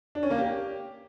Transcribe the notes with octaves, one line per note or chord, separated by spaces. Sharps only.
D4
C#4
A#3
G4